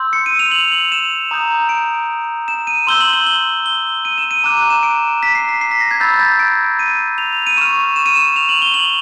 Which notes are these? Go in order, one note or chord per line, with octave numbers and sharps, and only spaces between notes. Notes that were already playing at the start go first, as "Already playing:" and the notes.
Already playing: C6 E6 G6
C#7
D#7
F7
F#7
F#7
E7
A#5 D#6 G6
D7
E7
D#7
C6 E6 G6 G7
F#7
F#7
G7
G7
D#7
E7
D#7
A#5 D6 F#6 D#7
D#7
E7
D7
B6
C7
B6
C7
B6
A#6
G#6
B5 E6 G6 A6
G6
G#6
D7
D#7
F7
D#7
C#6 F6 E7
E7
D#7
E7
F7
F#7
G7
F#7